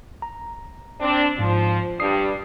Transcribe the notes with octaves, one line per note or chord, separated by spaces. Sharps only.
A#5
C4 D4
G#2 F3
G2 G3 D#6 C7